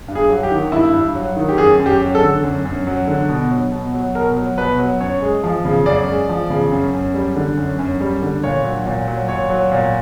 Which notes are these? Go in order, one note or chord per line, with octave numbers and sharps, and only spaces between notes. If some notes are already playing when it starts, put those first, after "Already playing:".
G2
G#4
F#3
G4
D#3
G2 E4
G2
F#3
D#3
G4
F#2 G#4
F#2
G4
F#3
A4
D3
F#2
F#2
F#3
D3
B2
F#3
B2
F#3
B2 A#4
F#3
B2 B4
F#3
F#2 C#5
G#3
F3
C#3
F#2 D5
G#3
F3
C#3
F#2
F#2
G3
D3
F#2
F#2
G3
D3
A#2 C#5
F#3
A#2
F#3
A#2 C#5
F#3
A#2